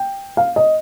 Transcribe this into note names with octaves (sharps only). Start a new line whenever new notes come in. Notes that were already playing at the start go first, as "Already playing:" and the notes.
Already playing: G5
F5
D#5